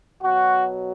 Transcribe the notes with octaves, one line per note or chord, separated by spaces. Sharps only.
B2 F#3 F#4